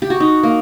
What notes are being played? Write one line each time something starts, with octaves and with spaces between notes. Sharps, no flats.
G4
F#4
D#4
A#3